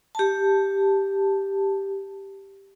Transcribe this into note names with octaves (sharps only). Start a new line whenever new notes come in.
G4 A5